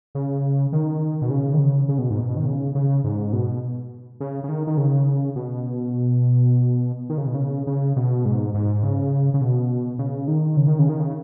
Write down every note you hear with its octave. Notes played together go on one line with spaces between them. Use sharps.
C#3
D#3
B2
C#3
D#3
C#3
C#3
B2
G#2
B2
D#3
C#3
C#3
G#2
B2
C#3
C#3
D#3
D#3
C#3
B2
D#3
C#3
B2
C#3
C#3
B2
G#2
G#2
C#3
C#3
B2
C#3
D#3
C#3
D#3
C#3
D#3
C#3